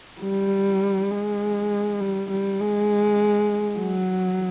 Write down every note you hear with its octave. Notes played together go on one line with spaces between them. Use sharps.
G3
G#3
G3
G3
G#3
F#3